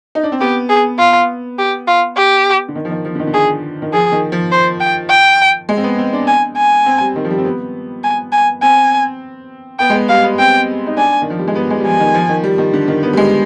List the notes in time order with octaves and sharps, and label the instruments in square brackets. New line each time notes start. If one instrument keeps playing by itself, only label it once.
[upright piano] D#4
D4
C4
[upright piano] B3 [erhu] G4
[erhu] G#4
F4
G4
F4
G4
[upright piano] D3
D#3
F3
D#3
F3
D3
D#3
D3
[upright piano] D#3 [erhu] G#4
[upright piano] D#3
[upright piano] F3 [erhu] G#4
[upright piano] D#3
F3
[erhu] C5
G5
G5
[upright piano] G#3
C4
B3
C4
D4
[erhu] G#5
G#5
[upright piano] C4
G3
D#3
F3
G3
C4
B3
[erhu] G#5
G#5
[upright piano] C4 [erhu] G#5
[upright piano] B3 [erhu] G5
[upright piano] G#3
B3
[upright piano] G3 [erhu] F5
[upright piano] B3
[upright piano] C4 [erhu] G5
[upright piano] D#4
[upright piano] D4 [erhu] G#5
[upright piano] D#3
F3
G3
G#3
B3
G#3
G3
[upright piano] F3 [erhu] G#5
[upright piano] D#3
F3
D#3
G3
D#3
D3
D#3
B3
G3
G#3